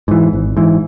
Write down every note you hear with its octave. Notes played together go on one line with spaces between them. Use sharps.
G#2 E3
G#1
G#2 E3